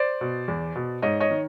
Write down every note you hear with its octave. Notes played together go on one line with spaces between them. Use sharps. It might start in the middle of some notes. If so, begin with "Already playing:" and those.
Already playing: C5 D5
B2
E2
B2
G#2 C#5 D#5
C#5 D#5
D#3